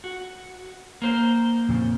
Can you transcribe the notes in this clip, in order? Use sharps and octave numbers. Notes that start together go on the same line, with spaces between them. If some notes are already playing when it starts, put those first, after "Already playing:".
F#4
A#3 C5
F2 A#2 C#3